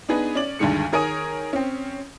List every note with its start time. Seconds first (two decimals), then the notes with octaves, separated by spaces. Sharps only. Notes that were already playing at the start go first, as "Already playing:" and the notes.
0.09 B3 D4 D#4 G#4 B4
0.35 C#4 D5 F#7
0.59 D2 G2 D3 D#3 G#3 C#7
0.92 D#3 G#4 A#4 C#5 G#5 D#6
1.53 C4 C#4